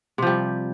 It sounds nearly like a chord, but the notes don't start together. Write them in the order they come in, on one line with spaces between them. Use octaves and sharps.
C3 F3 G3